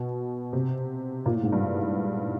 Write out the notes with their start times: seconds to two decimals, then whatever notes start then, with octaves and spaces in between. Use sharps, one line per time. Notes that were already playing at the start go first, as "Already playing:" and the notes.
Already playing: B2
0.53 C3
1.26 A#2
1.34 A2
1.43 G#2
1.52 G2